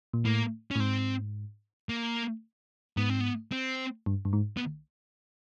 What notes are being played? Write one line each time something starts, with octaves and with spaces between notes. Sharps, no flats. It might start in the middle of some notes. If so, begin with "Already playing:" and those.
A#2
A2 A#3
C#4
A2
G#2 C4
A#3
G#2 B3
C4
B3
C4
G2
G2
G#2
B3